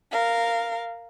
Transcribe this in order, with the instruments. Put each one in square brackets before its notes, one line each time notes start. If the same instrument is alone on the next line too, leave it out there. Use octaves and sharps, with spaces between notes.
[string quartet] A#4 F5